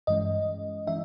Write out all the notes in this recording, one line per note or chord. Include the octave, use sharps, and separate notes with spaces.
G2 E3 G#3 C#4 D#5
E3 G#3 C#4 E5